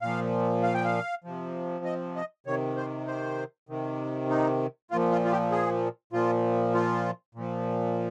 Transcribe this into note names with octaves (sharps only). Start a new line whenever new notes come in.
A#2 F3 F5
F5
G5
F5
C3 F3
D#5
D#5
C3 D#3 C#5
C5
C5
C3 D#3
D#4
A#2 F3 F4
F4
F4
G4
G#4
A#2 F3 F4
F4
A#2 F3